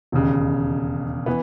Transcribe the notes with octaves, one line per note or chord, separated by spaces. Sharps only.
E1 D#2 C#3
E3 B3